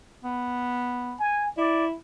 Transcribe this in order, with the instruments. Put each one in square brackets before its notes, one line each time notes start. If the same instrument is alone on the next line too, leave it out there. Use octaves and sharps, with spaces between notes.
[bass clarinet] B3
[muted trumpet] G#5
[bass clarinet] E4 [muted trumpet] D5